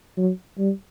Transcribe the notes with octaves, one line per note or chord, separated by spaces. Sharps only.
F#3
G3